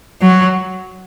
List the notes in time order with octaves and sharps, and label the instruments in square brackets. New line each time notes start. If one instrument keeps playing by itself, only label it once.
[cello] F#3